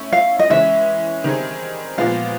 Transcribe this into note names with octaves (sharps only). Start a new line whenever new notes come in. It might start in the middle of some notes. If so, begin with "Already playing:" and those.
Already playing: A3 C#4 E4
F5
D#5
E3 G#3 C#4 E5
D#3 G3 C4 D#4 G#4
A#2 F3 G#3 B3 F5